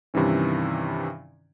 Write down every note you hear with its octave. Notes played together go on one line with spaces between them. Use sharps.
G2 C3 D#3 E3 C#4